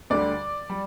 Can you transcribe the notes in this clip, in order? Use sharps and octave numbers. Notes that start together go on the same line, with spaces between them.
D2 D3 G3 D5
G3